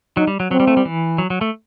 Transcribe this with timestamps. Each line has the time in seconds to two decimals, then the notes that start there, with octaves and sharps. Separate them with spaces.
0.16 F#3 D#4
0.27 G3
0.40 F#3
0.51 F#3 C4
0.60 G3
0.67 A3
0.77 G3
0.85 E3
1.18 F#3
1.30 F#3
1.41 A3